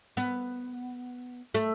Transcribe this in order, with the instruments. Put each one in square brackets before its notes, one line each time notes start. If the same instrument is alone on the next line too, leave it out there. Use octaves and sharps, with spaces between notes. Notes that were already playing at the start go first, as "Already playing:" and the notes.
[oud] B3
A3